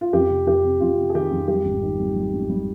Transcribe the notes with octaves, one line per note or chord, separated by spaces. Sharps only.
F4
F2 G4
C3
F2 G4
C3
F2 F4
C3
G#4
D#3 G4
F2
G3 G4
G#1
D#3
G3
G3
G#1
G3